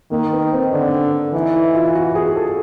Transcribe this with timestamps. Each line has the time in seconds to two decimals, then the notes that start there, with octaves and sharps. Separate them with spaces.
0.11 D#3 A#3
0.32 B3
0.52 C4
0.72 D3 D4
1.34 E3 D#4
1.54 E4
1.74 F4
1.95 F#4
2.15 G#4
2.36 A4